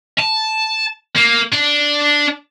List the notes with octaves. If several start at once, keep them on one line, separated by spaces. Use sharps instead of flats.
A5
A#3
D4